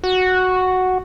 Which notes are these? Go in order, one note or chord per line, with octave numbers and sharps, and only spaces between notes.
F#4